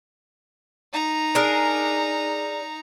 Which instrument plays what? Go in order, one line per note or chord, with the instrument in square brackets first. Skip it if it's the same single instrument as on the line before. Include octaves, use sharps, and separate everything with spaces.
[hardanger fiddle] D#4 A#5
[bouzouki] D4 G#4 A#4